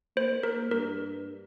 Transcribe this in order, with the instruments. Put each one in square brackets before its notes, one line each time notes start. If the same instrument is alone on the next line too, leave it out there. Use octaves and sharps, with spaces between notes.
[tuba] A#3 [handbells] C5
[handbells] A#4
[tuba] G2 [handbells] A#4